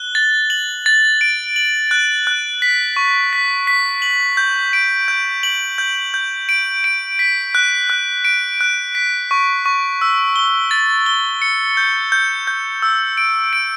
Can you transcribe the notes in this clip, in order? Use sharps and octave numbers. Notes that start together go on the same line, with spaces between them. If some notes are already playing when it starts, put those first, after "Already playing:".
Already playing: F#6 G7
A6
F#7
A6
D7
F#7
F#6
F#6
B6
C#6
B6
B6
F#7
G6
D7
G6
F#7
G6
G6
D7
D7
B6
F#6
F#6
D7
F#6
B6
C#6
C#6
E6
G7
A6
G7
C#7
G6
G6
G6
E6
D7
D7